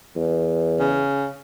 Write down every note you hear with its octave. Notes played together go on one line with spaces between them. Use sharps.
E2
C#3